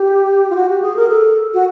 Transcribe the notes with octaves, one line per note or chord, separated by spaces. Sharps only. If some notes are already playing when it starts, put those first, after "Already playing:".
Already playing: G4
F4
F#4
G4
G#4
A#4
A4
F#4